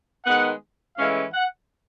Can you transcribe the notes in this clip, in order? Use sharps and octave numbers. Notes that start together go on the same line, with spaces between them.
D#3 G#3 B3 F#5
A2 E3 G#3 C#4 E4 F5
F#5